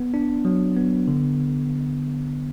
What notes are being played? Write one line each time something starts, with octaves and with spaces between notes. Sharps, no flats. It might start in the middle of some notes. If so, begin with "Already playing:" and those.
Already playing: B3
D4
F#3
B3
D3